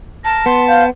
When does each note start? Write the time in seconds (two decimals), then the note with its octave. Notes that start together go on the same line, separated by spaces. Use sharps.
0.25 A#4 A5
0.46 B3 C6
0.68 C5 F5